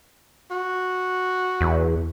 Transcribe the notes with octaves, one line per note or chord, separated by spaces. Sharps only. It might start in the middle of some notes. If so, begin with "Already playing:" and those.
F#4
E2